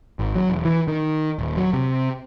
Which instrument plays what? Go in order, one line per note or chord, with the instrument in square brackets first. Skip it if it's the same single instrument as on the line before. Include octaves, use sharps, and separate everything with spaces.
[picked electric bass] G#1
F#3
E1
E3
D#3
D#1
F#3
C3